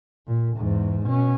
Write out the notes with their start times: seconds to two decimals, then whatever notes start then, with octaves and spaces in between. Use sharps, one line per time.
0.27 A#2
0.57 E2 G#2
1.07 B2 C#4